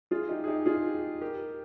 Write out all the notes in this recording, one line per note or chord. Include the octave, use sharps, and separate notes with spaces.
F4 G#4
D#4 G4
G#4
D#4 G4
F4 G#4
G4 A#4